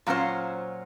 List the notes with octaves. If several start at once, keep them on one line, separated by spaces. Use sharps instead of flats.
A#2 F#3 C#4 F4 C5